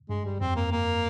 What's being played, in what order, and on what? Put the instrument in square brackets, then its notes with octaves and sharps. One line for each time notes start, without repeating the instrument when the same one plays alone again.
[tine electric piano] G2 [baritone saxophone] G#3
[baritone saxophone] G3
[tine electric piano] F2 [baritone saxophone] C4
[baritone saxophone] A#3
A#3